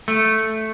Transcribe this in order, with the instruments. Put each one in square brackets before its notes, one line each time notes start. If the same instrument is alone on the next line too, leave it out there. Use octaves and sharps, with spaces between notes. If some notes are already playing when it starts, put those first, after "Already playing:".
[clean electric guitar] A3